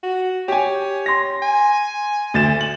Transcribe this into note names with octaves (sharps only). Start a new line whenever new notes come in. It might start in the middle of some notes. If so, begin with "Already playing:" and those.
F#4
G4 C#5 G#5
C6 A#6
G#5
D2 A6 E7
F#7